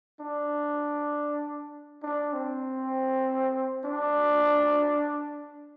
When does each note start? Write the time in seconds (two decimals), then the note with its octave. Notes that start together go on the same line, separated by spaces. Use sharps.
0.20 D4
2.03 D4
2.33 C4
3.85 D4